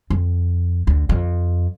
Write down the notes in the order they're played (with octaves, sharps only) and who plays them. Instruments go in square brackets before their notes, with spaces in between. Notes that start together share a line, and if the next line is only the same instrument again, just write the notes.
[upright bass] F2
D2
F2